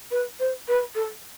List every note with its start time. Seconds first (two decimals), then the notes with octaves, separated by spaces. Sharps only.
0.11 B4
0.40 C5
0.68 B4
0.95 A4